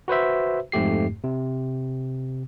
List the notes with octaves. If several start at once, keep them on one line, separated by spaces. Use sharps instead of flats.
F#4 B4 C5 E5
F2 G#2 A3 G4 C7
C3